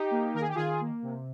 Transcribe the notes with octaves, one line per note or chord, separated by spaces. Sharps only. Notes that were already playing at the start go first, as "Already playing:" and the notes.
Already playing: D#4 G4
A#3
D#3 A#4
G#4
G4
D#3 F4 G#4
A#3
C3